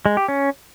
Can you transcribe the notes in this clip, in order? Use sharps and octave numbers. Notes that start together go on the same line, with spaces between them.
G#3
G4
C#4